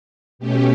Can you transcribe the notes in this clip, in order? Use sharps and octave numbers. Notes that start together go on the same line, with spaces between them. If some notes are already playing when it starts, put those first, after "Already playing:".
B2 A3 C#4 G4